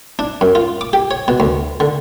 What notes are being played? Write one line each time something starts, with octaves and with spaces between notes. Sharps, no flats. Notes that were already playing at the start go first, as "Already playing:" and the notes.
D4
F#2
F4
D6
G4
C#5
B2
D2
D3